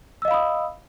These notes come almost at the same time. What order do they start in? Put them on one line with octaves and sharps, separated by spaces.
E6 D#5 F5 B5 D#6